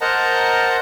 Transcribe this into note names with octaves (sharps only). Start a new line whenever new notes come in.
A#4 C5 D#5 F#5 A5 A#5